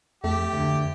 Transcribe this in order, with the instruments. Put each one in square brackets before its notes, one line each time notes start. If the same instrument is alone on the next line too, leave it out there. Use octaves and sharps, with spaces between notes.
[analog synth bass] F2 [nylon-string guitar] A3 [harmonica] G4
[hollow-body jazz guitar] D2 D3